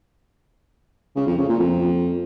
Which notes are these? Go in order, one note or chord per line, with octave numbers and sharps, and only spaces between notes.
C#3
F2
C#3
A#2
F2